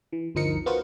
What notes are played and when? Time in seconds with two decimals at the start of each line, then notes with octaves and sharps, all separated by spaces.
0.13 E3
0.35 G1 D2 F3 D#4 A#4 C#7
0.66 B3 F4 F#4 A#4 C5